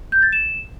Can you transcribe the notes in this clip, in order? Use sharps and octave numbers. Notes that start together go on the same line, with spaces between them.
G6
A6
E7